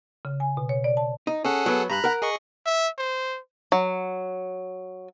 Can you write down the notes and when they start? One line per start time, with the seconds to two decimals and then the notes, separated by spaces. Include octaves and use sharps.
0.25 C#3
0.40 G#5
0.57 B2
0.69 C#5
0.84 D5
0.97 A5
1.27 D#4
1.44 C#4 G#4 A4 F#5
1.66 F#3 B3
1.90 G2 A#5 B5 F#6
2.04 A#4 F#5
2.22 G#4 D#5 C#6
2.66 E5
2.98 C5
3.72 F#3